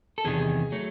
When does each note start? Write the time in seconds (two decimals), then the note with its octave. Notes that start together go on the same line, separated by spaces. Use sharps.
0.18 A4
0.25 E2 C3 D#3 G#4
0.72 F#3 A3